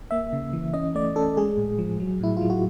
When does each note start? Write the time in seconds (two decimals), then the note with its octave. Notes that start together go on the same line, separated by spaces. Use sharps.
0.11 A#3 E5
0.33 C#3
0.53 E3
0.73 C#4 D#5
0.95 A3 D5
1.16 C#4 A4
1.37 G#3 G#4
1.57 A2
1.78 F3
2.00 F#3
2.21 A2 E4
2.37 F#3 F4
2.50 F#4